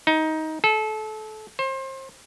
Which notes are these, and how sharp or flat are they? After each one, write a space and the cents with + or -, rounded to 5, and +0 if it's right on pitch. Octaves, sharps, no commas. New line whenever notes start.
D#4 +15
A4 -30
C5 +30